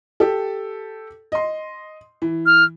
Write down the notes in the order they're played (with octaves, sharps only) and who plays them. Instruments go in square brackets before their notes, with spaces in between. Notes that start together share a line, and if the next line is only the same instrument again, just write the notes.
[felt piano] G4 A4
D#5 C6
E3
[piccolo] F6